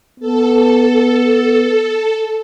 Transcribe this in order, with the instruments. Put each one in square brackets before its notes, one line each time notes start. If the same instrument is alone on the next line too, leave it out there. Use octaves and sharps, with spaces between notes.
[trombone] B3 [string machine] A4